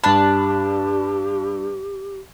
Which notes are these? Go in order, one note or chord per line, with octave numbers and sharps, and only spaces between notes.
G2 D4 G4 A5 B5